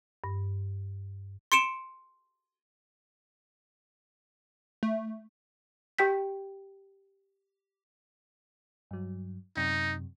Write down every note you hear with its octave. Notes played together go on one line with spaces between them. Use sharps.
G2
C6 C#7 D7 E7
A3
G4 G5 G6 B6
G2 F#3
F#2 C3 D#4